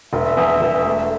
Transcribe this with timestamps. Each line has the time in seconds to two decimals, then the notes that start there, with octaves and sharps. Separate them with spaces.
0.13 E1 E5
0.37 E2
0.61 E1
0.86 A3